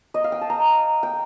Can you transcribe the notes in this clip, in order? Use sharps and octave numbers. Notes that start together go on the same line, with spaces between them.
D#5
F5
G5
A5
A#5
G5